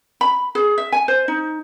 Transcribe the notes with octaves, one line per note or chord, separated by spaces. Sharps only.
B5
G#4
E5
G#5
C5
D#4